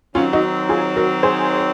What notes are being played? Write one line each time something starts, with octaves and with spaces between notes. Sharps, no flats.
D#3 F#3 C4 C#4 F4
D#4 F#4
F4 G#4
F#4 A#4
G#4 C5